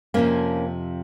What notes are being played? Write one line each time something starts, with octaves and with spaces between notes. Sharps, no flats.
F2 C3 F3 A#3 C#4